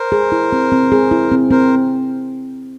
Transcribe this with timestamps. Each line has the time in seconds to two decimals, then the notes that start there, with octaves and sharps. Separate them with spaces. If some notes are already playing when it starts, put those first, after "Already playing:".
Already playing: A#4 C5
0.12 G#4
0.32 E4
0.52 C4
0.72 C4
0.92 G#4
1.11 E4
1.32 C4
1.51 C4 A#4 C5